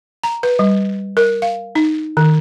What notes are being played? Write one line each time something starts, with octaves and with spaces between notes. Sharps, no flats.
A#5
B4
G3
A#4
F5
D#4
D#3